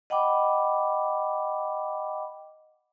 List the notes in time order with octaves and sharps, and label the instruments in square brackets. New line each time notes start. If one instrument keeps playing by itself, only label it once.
[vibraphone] D#5 F#5 G5 B5 D6